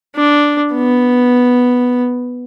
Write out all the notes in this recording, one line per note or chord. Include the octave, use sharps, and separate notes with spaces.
D4
B3